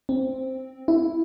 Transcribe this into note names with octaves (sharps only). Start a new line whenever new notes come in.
C4
E4